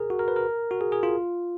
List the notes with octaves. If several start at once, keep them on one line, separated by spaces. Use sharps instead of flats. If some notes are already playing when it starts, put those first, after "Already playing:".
Already playing: G#4 A#4
F#4
A#4
B4
A#4
F#4
G#4
G#4
F4